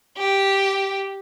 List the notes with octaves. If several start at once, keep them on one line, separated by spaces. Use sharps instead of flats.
G4